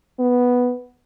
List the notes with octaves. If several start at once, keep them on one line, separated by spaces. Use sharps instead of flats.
B3